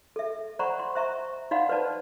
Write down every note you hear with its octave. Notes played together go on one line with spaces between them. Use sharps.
A4 E5
C5 D5 F#5 A#5 B5 C#6
C6
C5 E5 A#5 C#6
D#4 D5 F5 F#5 B5 C6
B4 C5 D5 A5